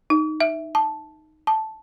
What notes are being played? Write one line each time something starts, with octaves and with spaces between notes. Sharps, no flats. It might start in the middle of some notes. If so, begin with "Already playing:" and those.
D#4
E5
A5
A5